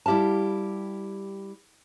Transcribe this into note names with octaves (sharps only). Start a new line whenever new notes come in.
G3 E4 G4 F5 A5